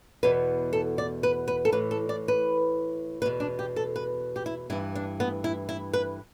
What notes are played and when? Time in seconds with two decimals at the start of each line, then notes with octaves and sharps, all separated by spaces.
0.23 E2 B2 B4
0.73 A4
0.98 D5
1.23 B4
1.48 B4
1.65 A4
1.72 A2 E3 B4
1.91 A4
2.09 D5
2.28 B4
3.22 E2 B2 B4
3.40 D4
3.59 G4
3.76 A4
3.96 B4
4.36 G4
4.46 E4
4.70 G2 E4
4.73 E3
4.95 D4
5.20 B3
5.44 E4
5.69 E4
5.93 B4